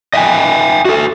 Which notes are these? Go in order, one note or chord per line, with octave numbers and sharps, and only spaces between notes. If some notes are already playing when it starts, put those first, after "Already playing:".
D#5 E5 G5 G#5
F#4 A4